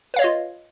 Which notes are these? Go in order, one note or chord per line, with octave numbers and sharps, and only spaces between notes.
F4 B4 C#5 D#5 F5